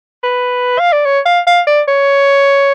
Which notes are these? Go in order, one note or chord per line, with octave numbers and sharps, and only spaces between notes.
B4
F5
D5
C#5
F5
F5
D5
C#5